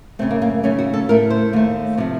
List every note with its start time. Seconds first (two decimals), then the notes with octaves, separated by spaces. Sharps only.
0.19 F#2 C#3 A3 C4
0.31 A#3
0.42 A#3
0.63 D#2 C#3 A3 C#4
0.79 F#4
0.94 A4
1.09 A2 A3 A#4
1.30 C5
1.53 D#2 D#3 A3
1.97 C3 F3 A3